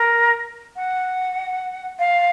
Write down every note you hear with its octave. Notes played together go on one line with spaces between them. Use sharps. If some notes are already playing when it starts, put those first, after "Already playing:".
Already playing: A#4
F#5
F5